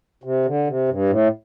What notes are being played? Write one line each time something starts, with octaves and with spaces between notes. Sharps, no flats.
C3
D3
C3
G2
A2